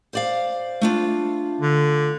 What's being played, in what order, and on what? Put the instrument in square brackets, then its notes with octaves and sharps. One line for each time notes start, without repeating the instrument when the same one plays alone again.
[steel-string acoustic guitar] C5 D5 F5
A3 D4 F4
[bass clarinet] D3